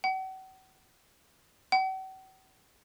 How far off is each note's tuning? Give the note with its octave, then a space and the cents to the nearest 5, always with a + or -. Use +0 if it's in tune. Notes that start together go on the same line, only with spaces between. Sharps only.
F#5 +40
F#5 +45